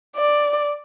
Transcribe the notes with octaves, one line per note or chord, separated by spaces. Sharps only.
D5